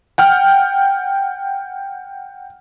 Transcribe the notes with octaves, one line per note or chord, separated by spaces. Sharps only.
F#5 G5 F6